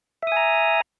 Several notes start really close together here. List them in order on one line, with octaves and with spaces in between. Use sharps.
E5 D#6 G#5 A#5